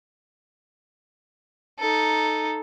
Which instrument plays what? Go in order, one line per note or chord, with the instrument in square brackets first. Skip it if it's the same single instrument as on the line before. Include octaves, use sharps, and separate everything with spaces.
[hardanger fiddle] D#4 A4